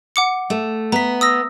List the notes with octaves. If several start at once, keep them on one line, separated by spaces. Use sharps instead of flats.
F#5 D6 C#7
A3
B3 A#5 B6
D#6 E6 A#6